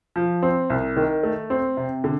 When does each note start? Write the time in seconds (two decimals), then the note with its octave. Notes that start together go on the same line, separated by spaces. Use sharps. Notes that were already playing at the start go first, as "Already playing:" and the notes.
0.16 F3
0.42 C4
0.70 C2
0.96 D#3
1.23 A3
1.50 C4
1.77 C3
2.04 D3